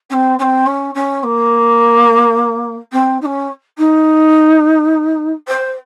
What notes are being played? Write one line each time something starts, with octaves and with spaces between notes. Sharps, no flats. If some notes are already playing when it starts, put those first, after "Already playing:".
C#4
C4
C#4
C4
C#4
C#4
A#3
C4
D#4
C#4
D#4
C5